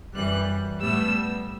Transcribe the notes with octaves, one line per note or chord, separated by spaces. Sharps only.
F#2 E3 G3 F#6
A2 G3 B3 E6